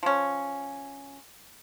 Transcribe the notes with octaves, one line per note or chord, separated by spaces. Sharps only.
F3 C#4